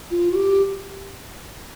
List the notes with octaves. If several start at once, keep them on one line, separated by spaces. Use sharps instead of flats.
F4
F#4
G4